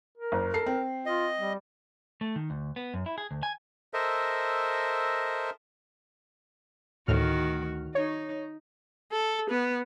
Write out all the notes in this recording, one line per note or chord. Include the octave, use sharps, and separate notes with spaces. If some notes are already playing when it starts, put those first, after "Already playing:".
A#4
F#1
A4 C7
C4
F4 D#5
G3
A3
D#3
D2
B3
F#2
E4
G#4
D2
G#5
A4 A#4 C5 D#5 E5
D2 A2 D#3 F#4 F6
D#4 C#5
A4
B3